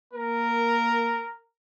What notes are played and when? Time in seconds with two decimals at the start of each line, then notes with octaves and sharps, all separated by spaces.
0.13 A#3 A#4